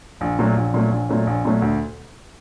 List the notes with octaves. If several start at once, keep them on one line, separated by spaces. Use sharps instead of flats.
A#1
A#2 F#3 A3 C#4
A#1
A#2 F#3 A3 C#4
A#1
A#2 F#3 A3 C#4
A#1
A#2 F#3 A3 C#4
D2